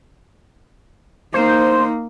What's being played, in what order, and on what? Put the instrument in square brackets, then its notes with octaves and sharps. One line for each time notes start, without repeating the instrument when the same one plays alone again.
[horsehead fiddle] A#3 D#4 [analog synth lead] C5